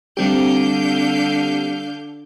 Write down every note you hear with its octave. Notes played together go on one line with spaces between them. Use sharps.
D3 G3 C4 G4 F5 G6